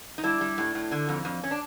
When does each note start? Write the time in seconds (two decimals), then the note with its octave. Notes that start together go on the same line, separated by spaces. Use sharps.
0.18 D#4
0.23 G3 D4 E4
0.41 G3
0.58 A2
0.75 A2
0.91 D3
1.09 F2
1.25 F2
1.44 C#4
1.51 D4